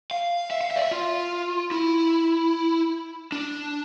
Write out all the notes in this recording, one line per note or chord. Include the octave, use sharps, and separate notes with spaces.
F5
E5
F5
E5
D5
E5
F4
E4
D4